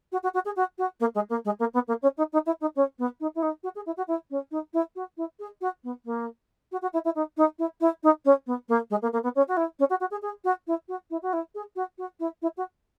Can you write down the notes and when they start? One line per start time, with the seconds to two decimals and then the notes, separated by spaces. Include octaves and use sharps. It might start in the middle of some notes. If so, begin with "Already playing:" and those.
0.12 F#4
0.23 F#4
0.34 F#4
0.45 G#4
0.56 F#4
0.78 F#4
1.00 A#3
1.15 G#3
1.29 A#3
1.45 G#3
1.59 A#3
1.73 B3
1.87 A#3
2.02 C#4
2.17 D#4
2.32 D#4
2.46 E4
2.60 D#4
2.75 C#4
2.98 B3
3.20 D#4
3.35 E4
3.42 D#4
3.63 F#4
3.75 G#4
3.86 E4
3.97 F#4
4.07 E4
4.30 C#4
4.51 D#4
4.73 E4
4.95 F#4
5.17 E4
5.39 G#4
5.61 F#4
5.83 B3
6.05 A#3
6.71 F#4
6.82 F#4
6.93 E4
7.04 E4
7.15 D#4
7.37 D#4
7.58 E4
7.80 E4
8.03 D#4
8.25 C#4
8.46 B3
8.68 A#3
8.90 G#3
9.02 A#3
9.12 A#3
9.23 B3
9.35 C#4
9.48 F#4
9.56 E4
9.79 C#4
9.90 F#4
10.00 F#4
10.11 G#4
10.22 G#4
10.44 F#4
10.67 E4
10.88 F#4
11.10 E4
11.22 F#4
11.33 E4
11.54 G#4
11.75 F#4
11.98 F#4
12.19 E4
12.42 E4
12.57 F#4